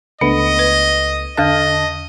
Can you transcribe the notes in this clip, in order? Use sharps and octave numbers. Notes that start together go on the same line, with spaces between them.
C#2 A3 B3 D4 D#5
B4
E2 D3 A4 D#5 A5 F6 F#6